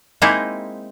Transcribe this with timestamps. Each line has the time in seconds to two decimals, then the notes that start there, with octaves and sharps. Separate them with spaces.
0.22 G#3 A#3 C4 D#4 E4